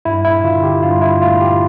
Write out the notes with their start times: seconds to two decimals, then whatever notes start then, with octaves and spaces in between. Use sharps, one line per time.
0.05 G2 E4
0.24 E4
0.44 D3 F4
0.63 G4
0.82 G2 F4
1.02 E4
1.22 A3 F4
1.41 G4